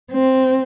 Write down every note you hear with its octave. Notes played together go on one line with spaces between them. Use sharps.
C4